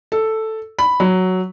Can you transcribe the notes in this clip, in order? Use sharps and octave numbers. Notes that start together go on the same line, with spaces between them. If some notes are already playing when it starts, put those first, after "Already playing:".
A4
B5
F#3